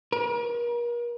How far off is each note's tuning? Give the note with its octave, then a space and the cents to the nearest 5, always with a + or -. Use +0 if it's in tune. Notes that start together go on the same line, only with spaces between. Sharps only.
A#4 +40